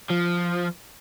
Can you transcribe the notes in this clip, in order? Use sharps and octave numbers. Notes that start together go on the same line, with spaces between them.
F3